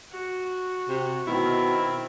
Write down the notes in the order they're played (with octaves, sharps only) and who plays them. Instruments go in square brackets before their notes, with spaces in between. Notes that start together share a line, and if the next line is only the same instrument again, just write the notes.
[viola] F#4
[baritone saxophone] C3
[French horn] B2 [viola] D#3 C4 [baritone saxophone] E4